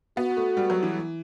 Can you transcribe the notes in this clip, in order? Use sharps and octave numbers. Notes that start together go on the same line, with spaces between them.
B3 F#4
A3
G3
F#3
E3